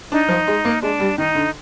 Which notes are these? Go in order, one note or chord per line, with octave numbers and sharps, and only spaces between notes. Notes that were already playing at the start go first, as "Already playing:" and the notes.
D4 D#4
F3
G#3
A#3
G#3 D4
G3
D#3 D#4
D3